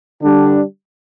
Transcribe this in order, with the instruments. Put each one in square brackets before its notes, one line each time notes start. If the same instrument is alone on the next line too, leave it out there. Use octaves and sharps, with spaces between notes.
[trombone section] D3 G3 D4